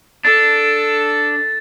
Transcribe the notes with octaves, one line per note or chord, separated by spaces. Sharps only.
D4 A4 A6